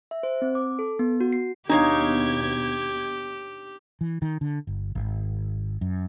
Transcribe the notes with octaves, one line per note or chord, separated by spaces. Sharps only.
E5
C5
C4
D6
A4
B3
F#4
C7
D#2 B2 D4 D#4 G4 C#5 F5 G#6
E3
D#3
D3
G1
G#1
F#2